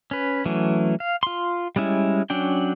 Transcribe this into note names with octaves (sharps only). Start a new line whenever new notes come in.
C#4 B4
E3 F#3 A3 C#4
F5
F4 C6
G3 G#3 C#4 E4
F#3 C#4 D4 G5